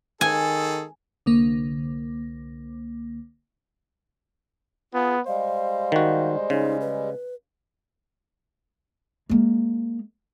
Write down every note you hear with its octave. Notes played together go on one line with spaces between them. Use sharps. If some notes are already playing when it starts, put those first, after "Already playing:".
D#3 G#4 A4 G#5
C2 D3 A#3
B3 F4 G#4
G3 G#3 C5 F5
D#3 F#4
C#3 D#4
B4
G#3 A#3